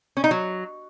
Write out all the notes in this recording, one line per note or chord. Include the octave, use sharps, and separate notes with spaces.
C#4
D#4
F#3